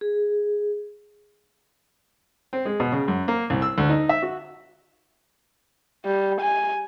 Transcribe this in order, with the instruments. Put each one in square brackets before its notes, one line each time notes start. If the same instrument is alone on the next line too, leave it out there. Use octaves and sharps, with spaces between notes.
[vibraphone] G#4
[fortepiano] C4
G#3
B2
C#3
F#2
A#3
C2
E6
D2
D#4
E5
F#4
[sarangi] G3
G#5